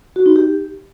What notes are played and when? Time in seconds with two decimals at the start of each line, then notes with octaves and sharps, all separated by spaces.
0.16 F#4
0.26 D#4
0.36 G4